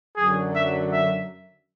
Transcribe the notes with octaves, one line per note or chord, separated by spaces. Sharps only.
F#2 D3 F#3 G#4
E5
E5